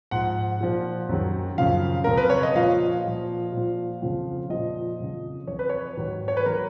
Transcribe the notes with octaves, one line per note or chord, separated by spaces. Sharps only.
G#2 F3 F#5
A#2 F3
F#2 D#3 F#3
F#2 C#3 F3 F5
F2 C#3 F3 A#4
B4
C#5
D#5
A#2 F3 F5
A#2 F3
A#2 F3
F2 C#3 F3
A#2 F3 D#5
F2 C#3 F3
F2 F3 C#5
B4
C#5
G#2 D#3 F#3
C#5
B4
D#3 F#3 A#4